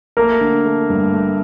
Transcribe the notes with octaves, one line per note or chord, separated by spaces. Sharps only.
A3 A#3 A#4
D3
A3
G2
A3